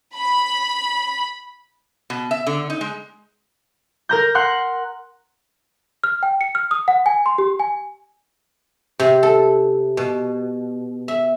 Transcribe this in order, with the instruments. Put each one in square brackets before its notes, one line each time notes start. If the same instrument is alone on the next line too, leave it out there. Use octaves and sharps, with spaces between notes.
[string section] B5
[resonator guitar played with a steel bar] B2
E5
D3
D#4
G#3
[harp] A#4 A#5 G6
F#5 C6 F#6
[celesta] F6
G5
C#7
F6
D#6
F#5
G#5
C6
G4
G#5
[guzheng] C3
A4
B2
E5